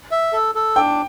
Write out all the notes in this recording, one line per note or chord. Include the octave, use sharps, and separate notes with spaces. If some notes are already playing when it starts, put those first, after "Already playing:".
E5
A4
A4
D4 G5